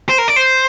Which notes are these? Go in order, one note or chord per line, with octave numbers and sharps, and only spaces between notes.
C5
A#4
D5
C5